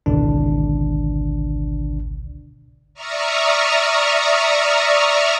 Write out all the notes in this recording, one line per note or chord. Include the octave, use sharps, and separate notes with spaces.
G#1 C#2 B2 D3 D4
D5 E5 A#5 C#6 D#6 F6